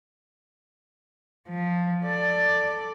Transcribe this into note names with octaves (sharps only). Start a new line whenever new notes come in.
F3
A4 D5